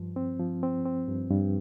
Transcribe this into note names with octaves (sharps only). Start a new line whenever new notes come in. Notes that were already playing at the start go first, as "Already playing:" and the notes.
Already playing: G2 F3
C4
F3
C4
C4
G2
G2